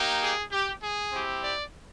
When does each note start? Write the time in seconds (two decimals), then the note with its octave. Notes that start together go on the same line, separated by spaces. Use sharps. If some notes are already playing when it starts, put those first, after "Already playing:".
Already playing: A#3 D#4 G4
0.22 G#4
0.52 G4
0.82 G#4
1.12 C4 E4 G4
1.43 D5